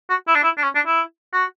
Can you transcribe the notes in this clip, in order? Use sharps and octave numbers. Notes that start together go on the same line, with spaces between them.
F#4
E4
D4
E4
D4
C#4
D4
E4
F#4